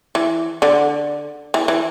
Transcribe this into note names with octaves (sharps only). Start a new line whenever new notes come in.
E3
D3
E3
E3